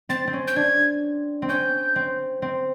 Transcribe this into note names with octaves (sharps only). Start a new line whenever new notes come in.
C4 A6
C4
C#4
G6
D4 G#6
C4
C#4 G6
C4
C4